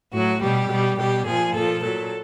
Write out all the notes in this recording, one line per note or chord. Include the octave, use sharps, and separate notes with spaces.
A2 F#3 F#4
B2 G3 G4
B2 G3
B2 G3 G4
A#2 F3 G#4
A#2 F3 A4
A#2 F#3 A4